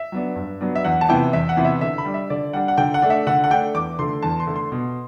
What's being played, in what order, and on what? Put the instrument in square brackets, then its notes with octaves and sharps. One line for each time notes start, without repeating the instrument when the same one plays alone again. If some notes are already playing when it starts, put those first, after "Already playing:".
Already playing: [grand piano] E5
F#3 B3 D4
G2
F#3 B3 D4
E5
E2 F#5
A5
C3 E3 B3 E4 G5
E2 E5
F#5
C3 E3 B3 E4
E5
D3 E5
B5
G3 D4
E5
D3 D5
G3 D4 F#5
F#5
D3 G5
F#5
A3 D4
E5
D3 F#5
F#5
A3 D4 G5
E2 D6
D3 A3 C6
E2 A5
C6
D3 A3
C6
B2